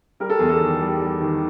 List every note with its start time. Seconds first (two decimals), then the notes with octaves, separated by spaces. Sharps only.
0.20 G3 A#4
0.30 A4
0.39 E2 G#4
0.49 A4
0.60 D#3
0.81 G3
1.01 G3
1.20 D#3